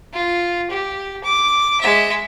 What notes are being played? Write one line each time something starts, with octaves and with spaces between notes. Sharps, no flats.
F4
G4
D6
G#3 E5